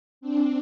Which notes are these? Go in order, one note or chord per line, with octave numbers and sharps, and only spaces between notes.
C4 D4